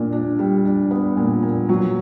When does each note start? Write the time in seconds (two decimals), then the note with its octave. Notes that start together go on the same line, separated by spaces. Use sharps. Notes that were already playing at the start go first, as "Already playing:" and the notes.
Already playing: A#2 D4
0.12 D4
0.39 G3
0.65 D4
0.91 B3
1.17 A#2
1.43 A#2
1.69 F#3